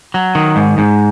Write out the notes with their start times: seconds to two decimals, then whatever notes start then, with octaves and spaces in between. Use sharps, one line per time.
0.14 F#3
0.35 D#3
0.56 G#2
0.78 G#2